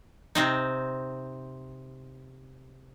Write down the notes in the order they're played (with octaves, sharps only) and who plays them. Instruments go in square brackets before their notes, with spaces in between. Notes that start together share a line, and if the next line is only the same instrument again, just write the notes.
[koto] C3 C4 D#4